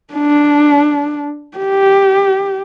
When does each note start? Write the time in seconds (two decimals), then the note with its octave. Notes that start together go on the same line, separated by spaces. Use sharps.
0.14 D4
1.57 G4